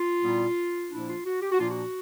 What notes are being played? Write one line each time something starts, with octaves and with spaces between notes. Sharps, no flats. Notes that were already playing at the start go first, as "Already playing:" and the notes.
Already playing: F4
A#2 G3 B3 E4
A#2 F3 A#3 D4 E4
F4
F#4
G4
F#4
A#2 F3 A#3 D4 F4
F#4